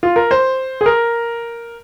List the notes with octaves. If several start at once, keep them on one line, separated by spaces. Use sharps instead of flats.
F4
A#4
C5
G#4
A#4